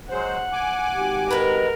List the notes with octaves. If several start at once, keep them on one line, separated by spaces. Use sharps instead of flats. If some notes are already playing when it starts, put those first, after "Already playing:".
F#3 G#3 C5 F#5
G#5 D6
G#1 F#4 G4
G#3 A#4 B4